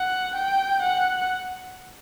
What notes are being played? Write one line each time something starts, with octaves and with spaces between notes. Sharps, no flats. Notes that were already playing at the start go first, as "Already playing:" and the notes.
Already playing: F#5
G5
F#5